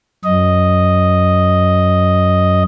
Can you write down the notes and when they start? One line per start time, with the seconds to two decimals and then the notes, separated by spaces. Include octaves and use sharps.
0.24 F#2 D#5